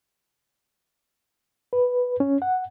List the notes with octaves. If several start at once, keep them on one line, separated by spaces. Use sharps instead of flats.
B4
C#4
F#5